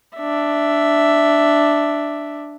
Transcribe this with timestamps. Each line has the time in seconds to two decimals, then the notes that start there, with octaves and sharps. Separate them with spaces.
0.16 D4 E5